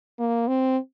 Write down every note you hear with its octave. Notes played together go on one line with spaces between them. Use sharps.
A#3
C4